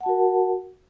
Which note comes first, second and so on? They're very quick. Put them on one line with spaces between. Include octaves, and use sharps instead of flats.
F#5 A5 F#4 A#4